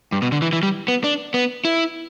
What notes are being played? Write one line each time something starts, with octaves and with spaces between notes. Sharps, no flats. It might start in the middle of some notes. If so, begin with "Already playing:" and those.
G2
B2
D3
E3
E3
G3
B3
D4
B3
E4